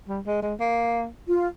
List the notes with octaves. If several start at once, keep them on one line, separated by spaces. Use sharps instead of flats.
G3
G#3
G#3
A#3
F4